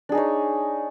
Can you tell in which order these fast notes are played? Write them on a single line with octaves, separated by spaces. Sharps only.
D4 G#4 D#4 C#5